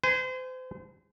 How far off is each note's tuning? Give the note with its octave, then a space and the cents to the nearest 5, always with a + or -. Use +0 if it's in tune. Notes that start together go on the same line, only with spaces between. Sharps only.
C5 -35 G#5 +0